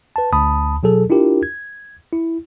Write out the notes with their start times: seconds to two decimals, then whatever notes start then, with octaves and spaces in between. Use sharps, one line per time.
0.16 B4 A5
0.33 D2 A5 B5 D#6
0.83 B2 F#3 G#4 A4
1.10 D4 E4 F4 G4 A#4
1.43 G#6
2.13 E4